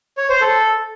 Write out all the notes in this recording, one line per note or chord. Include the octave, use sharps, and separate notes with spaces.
C#5
C5
A4